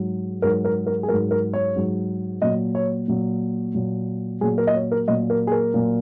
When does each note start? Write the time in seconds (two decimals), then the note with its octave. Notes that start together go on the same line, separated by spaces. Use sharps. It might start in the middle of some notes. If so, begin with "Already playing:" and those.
Already playing: G#2 F#3
0.42 G#2 F#3 A#4
0.65 A#4
0.87 A#4
1.03 G#4
1.09 G#2 F#3 A#4
1.31 A#4
1.53 C#5
1.76 G#2 F#3
2.42 A#2 F#3 D#5
2.75 C#5
3.08 A#2 F#3
3.75 A#2 F#3
4.41 A#2 F#3 G#4
4.58 A#4
4.67 D#5
4.74 C#5
4.92 A#4
5.08 A#2 F#3 D#5
5.30 A#4
5.47 G#4
5.52 A#4
5.74 A#2 F#3